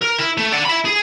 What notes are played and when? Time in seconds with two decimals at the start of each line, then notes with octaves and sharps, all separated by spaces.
0.02 A#4
0.19 E4
0.38 A3
0.52 D5 F#5
0.65 E5 B5
0.85 G#4